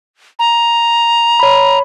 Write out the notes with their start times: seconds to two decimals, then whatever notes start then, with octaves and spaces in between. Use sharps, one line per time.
0.39 A#5
1.40 C#5 B5